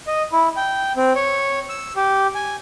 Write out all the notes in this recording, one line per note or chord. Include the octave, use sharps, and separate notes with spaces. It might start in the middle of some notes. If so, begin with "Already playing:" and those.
D#5
E4
G5
C4
C#5
E6
G4
G#5